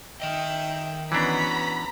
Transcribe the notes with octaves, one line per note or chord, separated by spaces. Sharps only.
D#3 D#5 E5 G5
E3 B3 C#4 D4 F#4 A#5 B5 B6